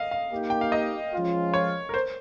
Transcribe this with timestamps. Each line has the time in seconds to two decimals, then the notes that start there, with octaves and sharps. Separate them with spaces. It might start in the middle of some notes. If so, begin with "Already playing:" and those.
Already playing: D#5 F5
0.11 F5
0.31 A#3 D#4 G4
0.50 G5
0.61 F5
0.72 D#5
1.13 F3 G#3 C#4 F4
1.54 C#5
1.89 A#4
1.94 C5